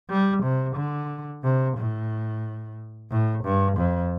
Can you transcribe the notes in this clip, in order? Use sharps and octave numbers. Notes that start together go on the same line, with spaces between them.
G3
C3
D3
C3
A2
A2
G2
F2